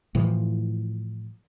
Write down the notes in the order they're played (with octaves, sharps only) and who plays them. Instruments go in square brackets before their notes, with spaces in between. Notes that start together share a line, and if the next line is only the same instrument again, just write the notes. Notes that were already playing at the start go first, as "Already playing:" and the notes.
[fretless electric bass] A2 E3 F3